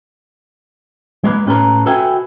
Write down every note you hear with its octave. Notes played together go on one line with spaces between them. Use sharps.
G#3 A#3 B4
A2 C#4 G4 A4 B4 A#5
F#4 A4 B4 E5 G5 G#5